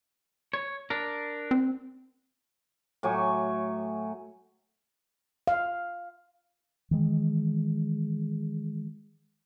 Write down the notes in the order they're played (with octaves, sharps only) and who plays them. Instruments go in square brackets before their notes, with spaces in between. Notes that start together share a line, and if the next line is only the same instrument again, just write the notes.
[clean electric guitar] C#5
D4 A#4
[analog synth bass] C4
[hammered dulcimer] A2 F#3 G#5 D6
[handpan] F5
[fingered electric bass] D#3 E3 G#3